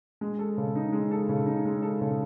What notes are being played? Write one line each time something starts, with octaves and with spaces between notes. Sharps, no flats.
G#3
A4
C#3
D#4
G#3
A4
C#3
D#4
G#3
A4
C#3